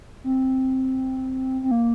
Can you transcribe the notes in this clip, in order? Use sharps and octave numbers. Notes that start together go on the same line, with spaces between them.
C4
C4
A#3